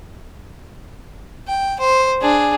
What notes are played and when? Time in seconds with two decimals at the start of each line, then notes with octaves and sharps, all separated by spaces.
1.48 G5
1.80 C5
2.21 D4 G#4